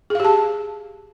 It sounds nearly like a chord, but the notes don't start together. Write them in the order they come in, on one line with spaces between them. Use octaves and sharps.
G#4 F5 G4 A5